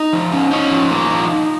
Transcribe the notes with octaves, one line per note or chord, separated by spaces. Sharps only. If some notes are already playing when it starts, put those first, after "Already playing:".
Already playing: D#4
F3
C#4
C#4 D#4
F3
A#3
F3